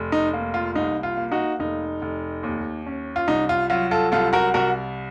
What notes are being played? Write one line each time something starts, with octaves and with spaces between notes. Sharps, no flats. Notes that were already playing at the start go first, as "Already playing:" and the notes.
Already playing: F1
D#4
A#3
F4
C2 D#4
F4
A#3
D#4 F#4
F1 D#4
F1
D#2
C#4
F4
C2 D#4
F4
F#3 F4
F4 A4
C2 F4 A4
F#4 A#4
C2 F#4 A#4